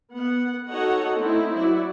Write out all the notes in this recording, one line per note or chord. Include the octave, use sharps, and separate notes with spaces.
B3 F#5
D#4 F#4 A4 C#5 D#5 F#5
A3 C4 D#4 E4
F#3 E4 F#4 D5